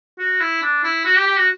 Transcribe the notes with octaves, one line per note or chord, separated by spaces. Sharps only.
F#4
E4
D4
E4
F#4
G4
G4
F#4